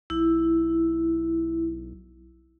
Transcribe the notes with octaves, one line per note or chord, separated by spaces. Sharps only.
B1 E4